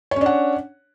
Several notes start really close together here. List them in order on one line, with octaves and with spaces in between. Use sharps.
C#5 C#4 D4 F#5